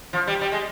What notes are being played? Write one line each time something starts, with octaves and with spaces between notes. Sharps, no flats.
F3
G3
G3
G#3